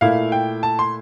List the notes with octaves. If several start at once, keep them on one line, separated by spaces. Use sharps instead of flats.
A#2 A3 E4 F5
G5
A5
C6